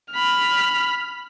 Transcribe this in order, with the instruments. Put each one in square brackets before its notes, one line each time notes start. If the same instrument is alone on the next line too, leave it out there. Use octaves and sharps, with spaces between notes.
[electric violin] B5 F6